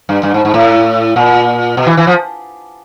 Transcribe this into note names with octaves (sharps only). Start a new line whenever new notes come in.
G2
G2
G#2
G#2
A2
A#2
B2
E3
E3
F3